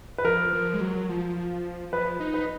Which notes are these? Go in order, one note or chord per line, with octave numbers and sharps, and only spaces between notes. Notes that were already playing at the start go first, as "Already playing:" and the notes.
B4
F3 A#4
F3
G#3
F#3
F3
F3 B4
D#4
B4